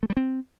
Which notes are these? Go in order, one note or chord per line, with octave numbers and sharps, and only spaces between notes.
A3
G3
C4